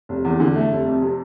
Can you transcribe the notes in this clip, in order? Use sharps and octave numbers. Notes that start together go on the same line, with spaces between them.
F1
E2
D3
A3
F1
F2
C3